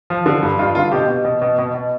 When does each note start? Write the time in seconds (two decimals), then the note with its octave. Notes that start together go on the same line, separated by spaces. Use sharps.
0.10 F3
0.26 D3
0.43 G2
0.59 G2 F4
0.75 D3 F4
0.92 B2 G4
1.08 B2
1.25 B2
1.42 B2
1.58 B2
1.75 B2